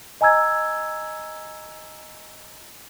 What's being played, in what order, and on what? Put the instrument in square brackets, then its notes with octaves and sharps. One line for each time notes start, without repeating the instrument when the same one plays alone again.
[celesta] D#5 G#5 A#5 E6 G#6